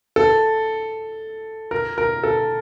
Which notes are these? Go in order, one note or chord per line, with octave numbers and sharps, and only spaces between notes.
A4
A#4
A#4
A4